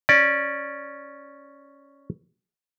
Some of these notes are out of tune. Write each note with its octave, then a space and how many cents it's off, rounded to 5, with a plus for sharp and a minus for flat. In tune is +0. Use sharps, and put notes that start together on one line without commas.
C#4 +0 D5 +5